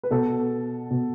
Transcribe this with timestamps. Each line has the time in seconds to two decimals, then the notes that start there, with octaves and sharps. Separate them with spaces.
0.03 B4
0.11 B2 A4
0.91 B2